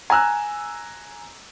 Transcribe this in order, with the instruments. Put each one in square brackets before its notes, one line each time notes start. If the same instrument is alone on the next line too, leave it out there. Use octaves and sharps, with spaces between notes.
[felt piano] G#5 A#5 E6 F#6